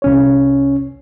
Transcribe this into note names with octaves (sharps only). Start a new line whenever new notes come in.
C2 C#4 C#5